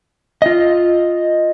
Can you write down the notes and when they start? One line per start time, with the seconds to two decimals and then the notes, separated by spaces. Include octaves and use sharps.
0.42 F4 D#5